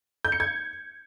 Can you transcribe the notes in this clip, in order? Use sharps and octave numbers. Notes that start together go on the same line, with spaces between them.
G6
C#7
G#6